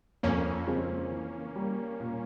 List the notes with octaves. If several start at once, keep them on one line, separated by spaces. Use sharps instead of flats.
F2 A#3 C#4
C#3 F3 G#3 C4
E3
G3 A#3
A#2